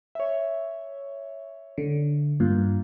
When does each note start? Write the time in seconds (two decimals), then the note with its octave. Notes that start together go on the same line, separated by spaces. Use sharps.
0.15 C#5 E5
1.78 D3
2.40 G2 A#3 F4